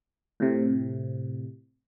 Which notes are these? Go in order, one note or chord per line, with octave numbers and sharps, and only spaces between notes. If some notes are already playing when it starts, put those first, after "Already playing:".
A2 C3